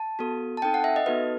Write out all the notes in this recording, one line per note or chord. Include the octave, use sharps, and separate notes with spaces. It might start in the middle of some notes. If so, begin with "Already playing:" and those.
Already playing: A5
B3 F#4 A4
A5
C4 D#4 A4 G5
F#5
E5
D#5
B3 D#4 F#4 A4 B4